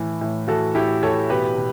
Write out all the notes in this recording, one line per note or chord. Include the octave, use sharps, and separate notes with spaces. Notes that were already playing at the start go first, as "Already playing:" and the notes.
Already playing: A2 E3
A2
E3 F#4 A4
A2 E4 G4
E3 A4 C#5
B2 G4 B4
B2